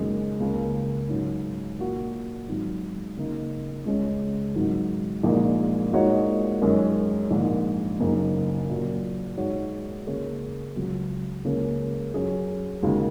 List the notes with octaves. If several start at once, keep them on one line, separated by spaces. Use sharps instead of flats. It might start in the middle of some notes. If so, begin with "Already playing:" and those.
Already playing: F#1 F#2 D#3 G#3 F#4
C#2 C#3 A#3
G#2 F#3 C#4
A#2 A#3 F#4
G#1 G#2 F#3
C#3 A#3 D#4
C#2 C#3 G#3 C#4
G#1 G#2 D#3 F#3
A#1 A#2 G#3 D#4 A#4
A#2 G#3 D#4 F#4 C#5
F#2 D#3 G#3 C#4
A#1 G#2 D#3
F#1 F#2 C#3 A#3 D#4
A#2 F#3 A#3
G#2 G#3 D#4 F#4 C#5
C#3 A#3 C#4 G#4 C#5
C#2 C#3 F#3
C#2 C#3 A#3 C#4 G#4
F#2 F#3 C#4 G#4
D#2 C#3 G#3 F#4 A#4